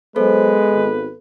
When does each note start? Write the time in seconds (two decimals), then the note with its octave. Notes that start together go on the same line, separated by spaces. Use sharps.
0.16 F#3 G#3 B3 A4 B4 C5
0.71 G#1